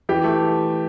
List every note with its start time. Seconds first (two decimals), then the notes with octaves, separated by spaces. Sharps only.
0.09 E3 G4
0.24 A3